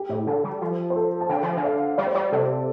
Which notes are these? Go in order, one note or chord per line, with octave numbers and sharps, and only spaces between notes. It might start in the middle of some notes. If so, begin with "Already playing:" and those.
Already playing: G4
A2
D3 A4
G3
F3
C5
A4
A5
D3 G5
F3
D3
F5
G3 D5
C5
G3 D5
C3 A4